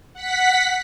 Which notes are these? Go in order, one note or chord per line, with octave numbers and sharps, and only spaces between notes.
F#5 B6